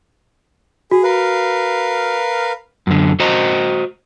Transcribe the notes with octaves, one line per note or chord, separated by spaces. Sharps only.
F#4 G#4
A#4 B4 F5
F#2 D3
F#4 C5 D#5 A#5